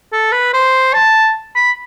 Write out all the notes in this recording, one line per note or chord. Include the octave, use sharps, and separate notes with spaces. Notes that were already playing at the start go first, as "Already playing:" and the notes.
A4
B4
C5
A5
B5